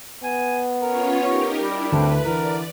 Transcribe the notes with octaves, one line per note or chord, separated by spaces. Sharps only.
B3 G#5
C#4 F4 A#4 C#5
D#4 G4 A#4 C#5
G3 D4 E4
D2 C4 B4 A5
D3 E3 A#4 D5